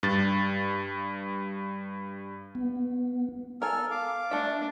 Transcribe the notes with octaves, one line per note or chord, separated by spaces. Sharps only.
G2 A6
B3
A4 A#4 G#5 F6
F5 D6
A3 D4 E5